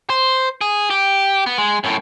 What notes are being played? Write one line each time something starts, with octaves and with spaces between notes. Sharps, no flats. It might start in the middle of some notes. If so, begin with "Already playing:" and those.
C5
G#4
G4
B3
G#3
F#2 A2